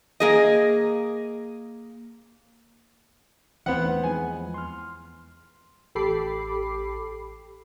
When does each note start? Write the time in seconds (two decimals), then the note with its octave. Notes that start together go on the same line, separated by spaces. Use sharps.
0.20 A#3 G#4 D#5
3.66 E2 E3 B3 C4 F#5
3.81 A3 D#4
4.04 F3 G#3 B3 G#5
4.54 C6 F6
5.95 A1 G4 A4 B5 D6 C7